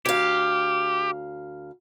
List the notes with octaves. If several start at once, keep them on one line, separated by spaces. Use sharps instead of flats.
D2 G4 F5